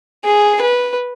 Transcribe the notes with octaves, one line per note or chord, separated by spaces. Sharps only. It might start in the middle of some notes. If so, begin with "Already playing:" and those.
G#4
B4